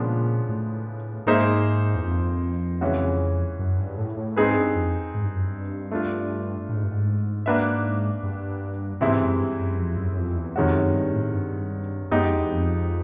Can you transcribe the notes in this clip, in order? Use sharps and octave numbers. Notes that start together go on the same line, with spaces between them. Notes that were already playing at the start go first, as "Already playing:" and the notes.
Already playing: A#2 C#3 F3 G#3 B3 D4
A2
G#2 A#3 D#4 G#4 C5 E5
E2
F2
C#3 E3 G#3 C#4 F#4
F#2
G2
A2
A2
G#2 C4 D#4 G#4 B4
G2
F2
G#2
G2
F#2
G2
A3 D4 F4
A2
G#2
G2
G#2
A#3 D4 F#4 B4 E5
G2
G#2 C3 E3 G#3 C4 E4
F#2
G2
F#2
F2
F#2
F#2
F2
E2
F2 C3 D#3 G#3 C#4 F#4
F#2
G2
A2
G2
F#2 G#3 B3 D#4 G4
F2
E2
F2